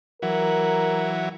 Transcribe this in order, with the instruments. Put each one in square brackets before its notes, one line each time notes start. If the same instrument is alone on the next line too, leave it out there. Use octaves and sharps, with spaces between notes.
[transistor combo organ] E3 F#3 [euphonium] A#4